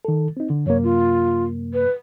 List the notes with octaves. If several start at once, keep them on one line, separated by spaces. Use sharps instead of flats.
D#3 A4
C4 D#4
D3
F#2 C3 A#3 C#5
F4
B4